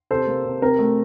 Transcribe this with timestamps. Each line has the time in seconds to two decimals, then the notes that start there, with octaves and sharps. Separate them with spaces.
0.11 C3 A4 C5
0.27 A#3
0.45 C3
0.62 C4 A#4
0.79 A3